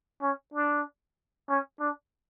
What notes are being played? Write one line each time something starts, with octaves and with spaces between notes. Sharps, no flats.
C#4
D4
C#4
D4